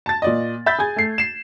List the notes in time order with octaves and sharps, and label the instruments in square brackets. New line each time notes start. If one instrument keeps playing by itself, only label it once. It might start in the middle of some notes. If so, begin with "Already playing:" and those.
[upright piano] A5 A6
A#2 D5 D#5
E5 B5 G6 A6
G#4 G#5 G#6
A3 C7
C7 E7